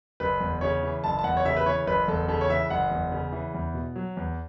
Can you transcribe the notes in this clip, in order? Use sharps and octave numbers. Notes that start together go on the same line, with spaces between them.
F#1 B4
E2
C#3 C#5
E3
F#1 A5
A5
E2 F#5
C#5
C#3 E5
B4
E3 C#5
F#1 B4
E2 A4
C#3 A4
C#5
E3 E5
F#1 F#5
E2
C#3
E3
E2
B2
F#3
E2